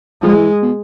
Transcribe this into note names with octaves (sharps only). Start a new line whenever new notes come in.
F3 G#3
E3
B2